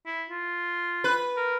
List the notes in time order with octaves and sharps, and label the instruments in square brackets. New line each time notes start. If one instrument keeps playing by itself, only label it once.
[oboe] E4
F4
[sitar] B4
[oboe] A#4